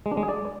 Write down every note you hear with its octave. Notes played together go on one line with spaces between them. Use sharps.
G#3
D4
G#3
G#4
D5